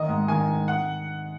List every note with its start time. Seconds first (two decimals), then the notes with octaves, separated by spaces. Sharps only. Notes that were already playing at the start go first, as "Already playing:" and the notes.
Already playing: D#3 D#5
0.08 G#2
0.28 D#3 G#5
0.48 G#2
0.68 F#5